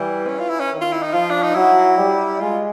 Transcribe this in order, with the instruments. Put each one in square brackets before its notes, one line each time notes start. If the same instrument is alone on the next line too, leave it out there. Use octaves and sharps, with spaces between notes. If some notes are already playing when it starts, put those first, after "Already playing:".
Already playing: [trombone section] E3 [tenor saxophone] G3
[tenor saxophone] C#4
F4
E4
C#4
[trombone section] D#3
[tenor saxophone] F4
E4
D#4
[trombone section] F3 [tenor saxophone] F4
[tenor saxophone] D4
D#4
[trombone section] F#3 [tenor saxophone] E4
[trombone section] G3
[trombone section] G#3 [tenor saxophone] F4